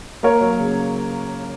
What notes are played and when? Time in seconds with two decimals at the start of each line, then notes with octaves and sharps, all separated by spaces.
0.23 A#3 A#4 C#5
0.41 F#3
0.59 C#3